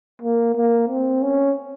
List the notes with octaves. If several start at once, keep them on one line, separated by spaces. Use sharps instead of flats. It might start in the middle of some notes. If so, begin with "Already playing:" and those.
A#3
A#3
C4
C#4